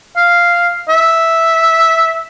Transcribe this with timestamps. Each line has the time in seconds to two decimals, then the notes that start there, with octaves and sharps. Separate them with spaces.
0.17 F5
0.89 E5